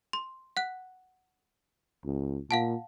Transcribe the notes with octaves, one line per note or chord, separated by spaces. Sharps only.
C6
F#5 F#6
C#2
A#2 F5 F#5 A5